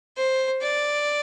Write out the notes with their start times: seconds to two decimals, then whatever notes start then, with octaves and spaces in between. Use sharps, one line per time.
0.17 C5
0.62 D5